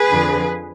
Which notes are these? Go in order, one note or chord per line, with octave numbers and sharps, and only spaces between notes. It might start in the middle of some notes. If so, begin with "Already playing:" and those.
Already playing: G#4 B4
F2 D3 F3